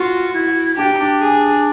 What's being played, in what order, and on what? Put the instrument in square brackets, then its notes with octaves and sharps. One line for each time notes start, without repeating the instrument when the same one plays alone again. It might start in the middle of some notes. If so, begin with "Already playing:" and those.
Already playing: [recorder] F4 [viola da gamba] F#4
[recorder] E4
[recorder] D4 [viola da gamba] G4
[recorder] D#4
D4
[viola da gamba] G#4